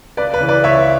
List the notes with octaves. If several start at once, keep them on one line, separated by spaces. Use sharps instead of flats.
C#2 B4 D5
B4
C#3 E3
B4 D5
C#2 C#5 E5